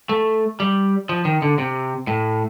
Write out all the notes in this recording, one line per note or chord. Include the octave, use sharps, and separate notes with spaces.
A3
G3
F3
D#3
D3
C3
A2